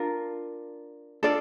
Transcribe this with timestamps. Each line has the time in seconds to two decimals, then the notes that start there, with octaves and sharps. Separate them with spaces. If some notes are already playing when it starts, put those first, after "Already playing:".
Already playing: D4 F4 A#4
1.23 D4 F4 A4 D5